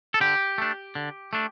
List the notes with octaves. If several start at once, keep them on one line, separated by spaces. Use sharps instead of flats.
A4
D3 G4
A3 D4
D3
A3 D4